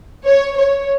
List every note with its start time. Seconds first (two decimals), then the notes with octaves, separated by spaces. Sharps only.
0.25 C#5
0.57 C#5